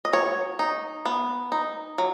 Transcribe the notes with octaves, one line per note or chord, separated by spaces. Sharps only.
D#5
F#3 C#5
D#4
B3
D#4
F#3